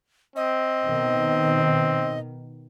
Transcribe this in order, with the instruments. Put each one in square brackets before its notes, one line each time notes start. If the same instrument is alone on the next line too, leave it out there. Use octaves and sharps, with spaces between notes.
[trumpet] C4 [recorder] D#5
[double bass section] B2 D#3